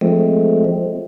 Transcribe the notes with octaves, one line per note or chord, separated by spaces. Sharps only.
F3 G#3 A3 C4